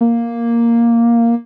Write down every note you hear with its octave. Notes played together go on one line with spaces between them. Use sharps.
A#3